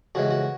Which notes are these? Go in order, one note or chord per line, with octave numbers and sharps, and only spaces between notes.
F2 C#3 E3 G#3 F#4
F#4